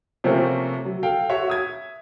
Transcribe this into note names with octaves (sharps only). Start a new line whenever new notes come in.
C3 F3 A3 A#3 C4 C#4
F#3
A4 F5 G5
F#4 C#5 E5
E5 D#6 G#6